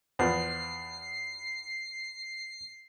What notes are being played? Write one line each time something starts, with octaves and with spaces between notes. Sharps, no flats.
E2 F3 B3 C7